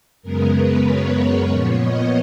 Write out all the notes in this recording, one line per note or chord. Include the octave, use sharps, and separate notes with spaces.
F#2 C#3 G#3 B3 A#4
B4
C#5
A#2 F3 B3
D#5